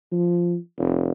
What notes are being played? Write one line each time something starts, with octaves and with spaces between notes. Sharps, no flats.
F3
F1